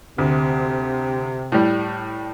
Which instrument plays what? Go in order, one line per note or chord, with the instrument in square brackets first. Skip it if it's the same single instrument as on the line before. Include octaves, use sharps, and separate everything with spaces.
[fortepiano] D2 [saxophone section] C3
[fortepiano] A2 G3